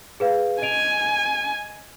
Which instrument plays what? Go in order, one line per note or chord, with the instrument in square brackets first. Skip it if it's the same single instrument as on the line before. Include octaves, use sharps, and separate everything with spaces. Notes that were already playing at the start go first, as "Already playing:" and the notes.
[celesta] G#4 B4 F5
[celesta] D#5 D7 F7 [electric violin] G#5